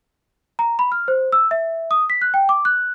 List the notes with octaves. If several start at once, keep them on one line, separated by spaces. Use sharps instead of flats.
A#5
B5
F6
C5
E6
E5
D#6
B6
F#6
G5
D6
F#6